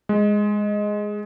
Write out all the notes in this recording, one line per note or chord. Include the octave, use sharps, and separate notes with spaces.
G#3